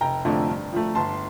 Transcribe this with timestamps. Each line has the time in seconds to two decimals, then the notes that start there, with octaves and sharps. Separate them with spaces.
0.01 F1 G5 A#5
0.25 F2 D3 F3 A3
0.49 G2
0.73 F3 A3
0.95 G1 A5 C6